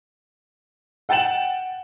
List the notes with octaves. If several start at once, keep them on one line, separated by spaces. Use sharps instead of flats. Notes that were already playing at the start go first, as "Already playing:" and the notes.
F#5 G5 A6 E7 F#7